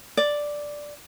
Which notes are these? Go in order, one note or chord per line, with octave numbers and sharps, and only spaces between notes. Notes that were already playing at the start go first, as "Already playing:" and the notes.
D5